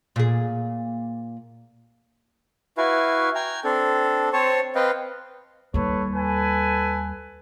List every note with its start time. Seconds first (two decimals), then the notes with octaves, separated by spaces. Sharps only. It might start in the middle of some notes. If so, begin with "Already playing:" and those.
0.16 A#2 G#4
2.78 E4 F#4 B4 F5 G#5
3.35 G5 G#5 A#5
3.64 C4 D4 A4
4.33 C4 C5 C#5 A5 C#6
4.75 C4 B4 D#5 F5 G5
5.74 D#2 G3 A4 B4 C#5
6.14 A4 B4 G#5